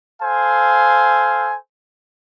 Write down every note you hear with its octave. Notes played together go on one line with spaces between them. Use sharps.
A4 C5 F5 G#5